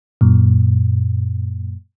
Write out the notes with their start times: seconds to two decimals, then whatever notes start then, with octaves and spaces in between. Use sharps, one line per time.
0.21 F#2 A#2